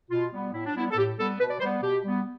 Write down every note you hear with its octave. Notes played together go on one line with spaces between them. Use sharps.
B2 F4
G3 B3
A2 E4
D4
G3 B3 E4
A4
A2 G4
G3 B3 A4
B2 B4
D5
G3 B3 C5
B2 G4
G3 B3